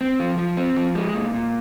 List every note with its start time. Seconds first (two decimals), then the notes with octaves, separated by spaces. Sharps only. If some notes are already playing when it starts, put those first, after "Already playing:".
0.01 C4
0.19 F3
0.38 F3
0.57 C4
0.77 F3
0.95 G#3
1.14 A#2
1.34 A#2